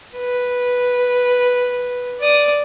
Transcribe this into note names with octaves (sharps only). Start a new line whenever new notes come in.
B4
D5 D#6